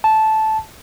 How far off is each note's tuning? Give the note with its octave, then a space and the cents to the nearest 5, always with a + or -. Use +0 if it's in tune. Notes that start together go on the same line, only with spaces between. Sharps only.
A5 -10